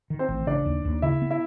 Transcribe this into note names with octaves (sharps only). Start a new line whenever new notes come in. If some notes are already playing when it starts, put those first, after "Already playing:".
D#3
C4 C5
A1
C#3 D4 D5
D#2
D#2
C#3 E4 E5
B3
E4 E5